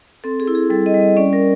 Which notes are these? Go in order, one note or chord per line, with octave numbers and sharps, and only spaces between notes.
C4 A4
G#4
E4
G#4
G3 A4
D#5
G3
D#5
C#4 D5
A#4